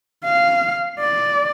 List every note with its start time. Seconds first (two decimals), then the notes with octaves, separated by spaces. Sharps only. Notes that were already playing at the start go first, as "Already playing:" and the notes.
0.25 F5
1.00 D5